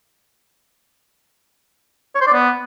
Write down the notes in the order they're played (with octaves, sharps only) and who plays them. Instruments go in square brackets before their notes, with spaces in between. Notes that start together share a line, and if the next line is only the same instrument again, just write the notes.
[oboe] C#5
C5
D5
B3